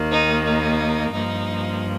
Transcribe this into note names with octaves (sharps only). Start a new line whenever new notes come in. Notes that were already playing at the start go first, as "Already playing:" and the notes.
Already playing: D#2 D#3 A#3
D#4
D#4
G2 F3 A#3 D#4